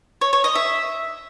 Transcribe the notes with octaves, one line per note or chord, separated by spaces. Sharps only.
C#5
C#5
D#5
E5